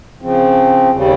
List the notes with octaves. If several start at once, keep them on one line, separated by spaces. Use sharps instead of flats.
C#3 F3 C4
D#2 C#3 G3